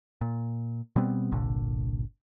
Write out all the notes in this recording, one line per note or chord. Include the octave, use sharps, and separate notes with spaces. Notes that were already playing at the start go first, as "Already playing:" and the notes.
A#2
B2 G3 B3 C4
G1 C2 A#2 D3